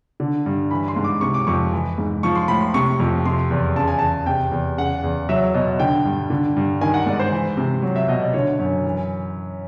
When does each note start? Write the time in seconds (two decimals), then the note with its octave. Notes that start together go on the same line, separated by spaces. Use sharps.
0.20 D3
0.46 G2
0.71 E3 B5
0.88 C6
0.96 G#2
1.04 D6
1.21 C3 C#6
1.34 D6
1.47 F2 C#6
1.72 E3
1.98 G#2
2.23 F3 C#6
2.35 C6
2.48 A2 B5
2.61 C6
2.74 C3 C#6
3.00 F2
3.25 C3 C6
3.51 E2
3.76 C#3 A5
3.87 G#5
3.99 E2 A5
4.26 C3 G5
4.52 E2
4.78 C#3 F#5
5.04 E2
5.29 F#3 E5
5.54 B2 D#5
5.79 D3 G5
6.05 G2
6.30 D3
6.56 G2
6.81 D#3 G#5
6.94 F#5
7.06 G#2 D5
7.19 C5
7.32 E3
7.57 C3
7.82 F#3
7.96 E5
8.08 B2 D#5
8.22 D5
8.33 D3 C#5
8.59 F#2
8.85 E3